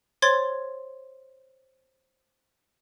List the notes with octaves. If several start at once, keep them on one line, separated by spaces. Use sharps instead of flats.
C5 C#5 C6 G#6 A6